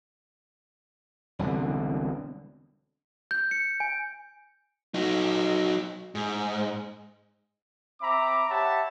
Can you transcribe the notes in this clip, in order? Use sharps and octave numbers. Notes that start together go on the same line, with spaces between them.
E1 C2 B2 D3
G6
C#7
G#5
F#3 D#4
G#2
C4 E5 A#5 B5 D6
G4 C#5 E5 F#5 A5 B5